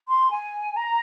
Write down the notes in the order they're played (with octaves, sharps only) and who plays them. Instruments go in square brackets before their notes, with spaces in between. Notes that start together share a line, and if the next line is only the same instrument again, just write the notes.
[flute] C6
G#5
A#5